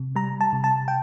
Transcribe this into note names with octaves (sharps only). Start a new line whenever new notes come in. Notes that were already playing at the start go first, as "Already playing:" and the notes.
Already playing: C3
G3 A#5
A5
C3
A5
G5